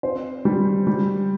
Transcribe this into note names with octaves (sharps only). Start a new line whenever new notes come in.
C4 C5
G3
G3